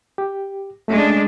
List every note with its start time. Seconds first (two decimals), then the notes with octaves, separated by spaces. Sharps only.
0.18 G4
0.88 G#3 A3 C#4 D4